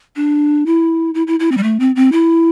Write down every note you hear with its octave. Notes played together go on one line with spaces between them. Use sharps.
D4
E4
E4
E4
E4
C4
G3
A3
C4
C4
E4